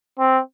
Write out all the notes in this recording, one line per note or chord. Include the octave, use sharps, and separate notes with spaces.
C4